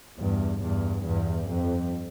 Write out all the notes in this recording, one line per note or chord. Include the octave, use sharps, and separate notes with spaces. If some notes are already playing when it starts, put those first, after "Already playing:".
E2 G2
E2 G2
E2 G2
F2